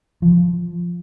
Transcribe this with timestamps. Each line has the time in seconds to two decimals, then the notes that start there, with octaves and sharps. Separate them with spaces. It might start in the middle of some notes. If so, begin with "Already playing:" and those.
0.22 F3